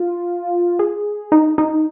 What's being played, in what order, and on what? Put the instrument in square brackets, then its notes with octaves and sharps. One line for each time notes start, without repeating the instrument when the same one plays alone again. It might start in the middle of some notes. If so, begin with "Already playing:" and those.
Already playing: [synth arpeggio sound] F4
G#4
D#4
D#4